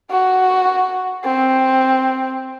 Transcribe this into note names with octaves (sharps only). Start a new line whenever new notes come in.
F#4
C4